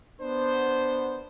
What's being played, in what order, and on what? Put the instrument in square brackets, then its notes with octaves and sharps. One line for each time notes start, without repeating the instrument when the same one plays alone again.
[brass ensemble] B3 D4 C5